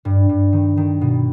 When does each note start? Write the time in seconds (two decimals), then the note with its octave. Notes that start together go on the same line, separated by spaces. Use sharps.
0.05 G2
0.29 G2
0.53 D#3
0.77 D#3
1.01 B2